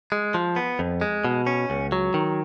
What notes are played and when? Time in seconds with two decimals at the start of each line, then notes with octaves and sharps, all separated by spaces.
0.12 G#3
0.34 F3
0.56 B3
0.79 F2
1.01 G#3
1.24 B2
1.47 C#4
1.70 C#2
1.92 F#3
2.14 D#3